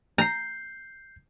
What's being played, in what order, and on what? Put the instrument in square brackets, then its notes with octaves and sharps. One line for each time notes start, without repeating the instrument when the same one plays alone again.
[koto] A#5 [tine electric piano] G6 C7